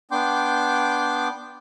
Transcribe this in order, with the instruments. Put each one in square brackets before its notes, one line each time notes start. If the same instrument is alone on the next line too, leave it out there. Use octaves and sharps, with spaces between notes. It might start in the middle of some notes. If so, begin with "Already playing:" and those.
[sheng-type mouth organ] B3 D4 G5 C6 D6 G6